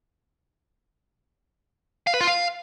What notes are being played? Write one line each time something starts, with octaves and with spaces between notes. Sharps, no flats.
F5
B4
F4
F5